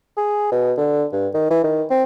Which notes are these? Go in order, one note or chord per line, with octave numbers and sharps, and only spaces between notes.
G#4
B2
D3
G2
D#3
E3
D#3
C4